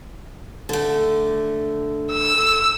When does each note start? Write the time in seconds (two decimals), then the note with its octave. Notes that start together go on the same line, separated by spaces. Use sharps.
0.69 D3 A3
2.11 E6